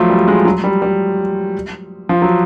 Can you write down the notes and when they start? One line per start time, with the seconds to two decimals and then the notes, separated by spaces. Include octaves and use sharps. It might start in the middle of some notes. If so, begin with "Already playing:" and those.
Already playing: F3 F#3 A3
0.10 G3
0.28 G#3
0.45 F#3
0.64 G3
0.82 G3
2.09 F3
2.22 F#3